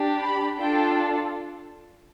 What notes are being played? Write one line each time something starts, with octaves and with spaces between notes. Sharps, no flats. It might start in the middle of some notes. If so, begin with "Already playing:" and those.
Already playing: D4 G4
B5
D4 F4 A4 G5